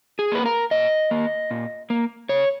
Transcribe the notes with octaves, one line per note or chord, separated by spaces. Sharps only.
G#4
A#3 B4
A#4
A#2 D#5
A#3
A#2
A#3
C#3 C#5